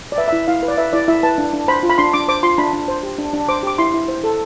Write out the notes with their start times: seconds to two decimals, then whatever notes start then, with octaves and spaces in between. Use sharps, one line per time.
0.12 D5
0.18 B4 E5
0.28 E4 E5
0.48 E4 F5
0.63 B4
0.68 D5
0.78 B4 E5
0.93 E4 D5
1.08 E4 E5
1.23 B4 A5
1.38 D4
1.53 D4
1.68 C5 B5
1.83 F4
1.90 B5
1.98 D4 C6
2.13 D4 D6
2.28 C5 D6
2.43 F4 C6
2.58 D4 B5
2.73 D4
2.88 C5
3.03 G4
3.18 D4
3.33 D4
3.48 C5 D6
3.63 G4 D6
3.78 E4 C6
3.94 E4
4.08 C5
4.24 A4